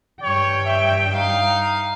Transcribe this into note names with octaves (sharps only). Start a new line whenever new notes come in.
G2 C#5 G5
E5
D#4 F5